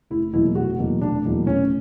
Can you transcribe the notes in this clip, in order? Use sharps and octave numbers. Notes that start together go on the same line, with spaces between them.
F1 E4
E2 B2 F#3 A#3 E4
F1 F#4
E2 B2 F#3 A#3
F1 D4
E2 B2 F#3 A#3
F1 C#4